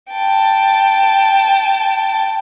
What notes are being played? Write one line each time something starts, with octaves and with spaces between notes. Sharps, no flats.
G5 A5